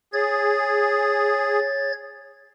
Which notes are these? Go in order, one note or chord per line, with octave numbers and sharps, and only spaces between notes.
G#4 C#5 G#6 A6